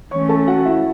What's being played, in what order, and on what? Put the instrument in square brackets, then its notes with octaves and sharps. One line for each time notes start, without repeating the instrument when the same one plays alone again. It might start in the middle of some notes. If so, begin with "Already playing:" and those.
[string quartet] E3 A3 C#4 [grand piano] C#5 C#6
[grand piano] A4 A5
F#4 F#5
E4 E5